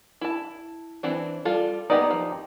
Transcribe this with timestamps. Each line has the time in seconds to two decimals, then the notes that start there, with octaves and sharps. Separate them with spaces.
0.21 E4 A5
1.03 E3 C4 D4
1.45 G3 F4 A4
1.90 A#3 B3 D#4 G4 D5
2.11 F3